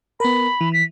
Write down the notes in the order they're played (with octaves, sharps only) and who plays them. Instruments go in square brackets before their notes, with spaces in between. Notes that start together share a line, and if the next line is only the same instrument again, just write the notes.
[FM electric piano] B3 A#4 [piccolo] B5
[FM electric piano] E3
[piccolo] B6